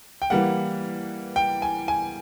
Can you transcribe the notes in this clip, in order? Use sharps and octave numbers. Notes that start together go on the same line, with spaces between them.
G5
E3 G3 A#3 F#5
G5
G#5
G#5